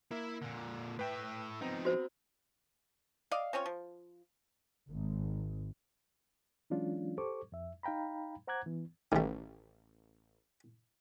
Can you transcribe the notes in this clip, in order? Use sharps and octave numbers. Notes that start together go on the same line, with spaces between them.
A#3 E4 E5
A#2 D3
A2 B4 E5 G5
F3 B3 C4 D#4 A#5
F#4 C5
D5 D#5 F5
C4 C#4 F4 C#5
F3
G#1
E3 F#3 G#3 C#4 D4 F4
G4 A4 C5 C#6 D6
F2 E5
D#4 F5 G5 A#5 B5
C5 F#5 A#5 D6 F#6 G#6
E3 B3
A1 D#3 G3